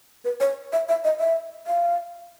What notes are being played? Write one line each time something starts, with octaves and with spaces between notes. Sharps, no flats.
B4
C#5
E5
E5
D#5
E5
F5